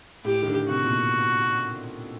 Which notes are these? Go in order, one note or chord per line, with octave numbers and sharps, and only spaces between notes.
A2 G4
D#3
D3
C3 F#4
A#2
B2